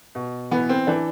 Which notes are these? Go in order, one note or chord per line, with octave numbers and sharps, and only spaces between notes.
B2
E3 B3
C4
E3 D4